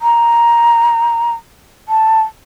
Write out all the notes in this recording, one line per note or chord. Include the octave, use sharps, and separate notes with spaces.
A#5
A5